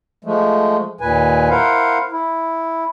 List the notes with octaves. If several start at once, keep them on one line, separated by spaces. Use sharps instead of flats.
F3 G#3 A3
D#2 A#2 B4 G#5
E4 A#4 C5 F5 F#5
E4